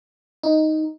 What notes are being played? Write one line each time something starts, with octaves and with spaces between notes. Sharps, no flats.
D#4